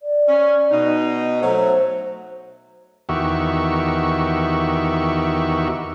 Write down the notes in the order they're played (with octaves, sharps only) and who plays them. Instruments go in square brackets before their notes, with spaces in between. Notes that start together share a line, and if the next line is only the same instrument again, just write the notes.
[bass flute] D5
[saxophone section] C#4
B2 D#4
[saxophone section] F#3 A3 [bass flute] C5
[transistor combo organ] E2 D#3 F#4 G4 E5 C#6